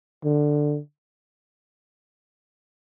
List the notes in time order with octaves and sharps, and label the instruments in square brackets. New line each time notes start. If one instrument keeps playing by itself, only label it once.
[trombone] D3